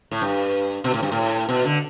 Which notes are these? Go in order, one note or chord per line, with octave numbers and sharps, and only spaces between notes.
A2
G2
B2
A2
G2
A2
B2
D3